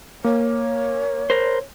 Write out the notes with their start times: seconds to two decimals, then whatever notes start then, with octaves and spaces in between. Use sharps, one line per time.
0.24 A#3 C#5
1.30 A#4 C5